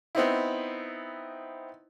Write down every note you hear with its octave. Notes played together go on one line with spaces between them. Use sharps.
B3 C4 D#4 E4